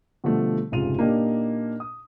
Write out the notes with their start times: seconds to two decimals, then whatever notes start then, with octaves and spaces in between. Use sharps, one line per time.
0.24 B2 D3 F3 G3 A3
0.72 F1 G#2 C#3 F4 D#7 F7
0.98 A#2 A#3 D4 D#4 G4
1.80 D#6